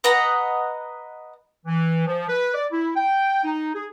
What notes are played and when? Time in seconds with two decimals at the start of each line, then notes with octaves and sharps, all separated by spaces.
0.04 B4 D#5 F#5 A#5
1.66 E3
2.07 F3
2.29 B4
2.54 D5
2.72 E4
2.96 G5
3.44 D#4
3.75 G#4